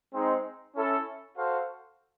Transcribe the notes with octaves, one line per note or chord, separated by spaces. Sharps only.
G#3 C4 D#4
C#4 E4 A4
F#4 A4 C5 F5